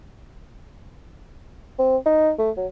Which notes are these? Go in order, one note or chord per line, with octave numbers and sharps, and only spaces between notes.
C4
D#4
A3
F#3